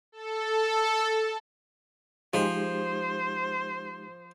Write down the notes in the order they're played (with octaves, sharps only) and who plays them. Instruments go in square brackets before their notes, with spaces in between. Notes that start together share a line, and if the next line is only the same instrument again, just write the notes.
[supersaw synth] A4
[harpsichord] F3 G#4 [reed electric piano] G#3 D#4 G4 [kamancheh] C5